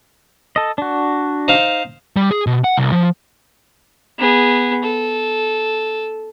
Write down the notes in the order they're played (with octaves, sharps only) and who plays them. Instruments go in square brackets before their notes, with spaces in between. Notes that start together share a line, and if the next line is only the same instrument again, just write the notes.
[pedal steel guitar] A4 D#5
D4 F#4
[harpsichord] D#4 C5 F5
[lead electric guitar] G3
G#4
B2
F#5
C2
F3
[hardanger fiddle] B3 G#4
A4